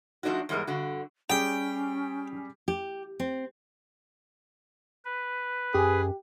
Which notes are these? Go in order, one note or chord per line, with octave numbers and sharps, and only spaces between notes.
F3 A3 C4 D4 D#4 F#4
E2 G#2 G3 G#3 A#4 A#5
G2 D3 F#4
G3 C#4 G4 G#4 G5
G4
C4
B4
F#2 G4 G#4